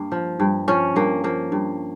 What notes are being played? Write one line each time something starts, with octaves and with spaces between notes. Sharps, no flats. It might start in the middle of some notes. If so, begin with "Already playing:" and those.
Already playing: G2 A#3
F3
G2
F3 C#4
G2 A#3
F3 A#3
G2